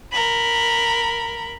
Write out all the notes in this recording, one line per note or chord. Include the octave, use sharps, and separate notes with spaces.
A#4 B5